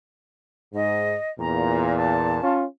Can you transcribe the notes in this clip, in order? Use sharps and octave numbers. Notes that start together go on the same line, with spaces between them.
G#2 D#5
E2 A#2 A#5
A5
C#4 F4